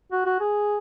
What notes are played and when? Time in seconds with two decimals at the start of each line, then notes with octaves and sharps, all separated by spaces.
0.12 F#4
0.26 F#4
0.40 G#4